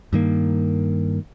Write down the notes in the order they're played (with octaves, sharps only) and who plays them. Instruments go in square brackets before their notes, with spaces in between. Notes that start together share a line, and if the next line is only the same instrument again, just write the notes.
[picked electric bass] G2 D#3 A#3